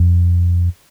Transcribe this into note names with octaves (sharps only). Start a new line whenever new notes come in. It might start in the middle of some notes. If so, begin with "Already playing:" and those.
Already playing: F2